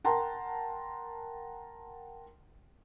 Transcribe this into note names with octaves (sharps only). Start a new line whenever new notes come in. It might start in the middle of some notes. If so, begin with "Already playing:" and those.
A#4 F#5 G5 A5 A#5 C6